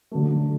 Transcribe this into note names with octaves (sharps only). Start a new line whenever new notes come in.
D3 F#3 A3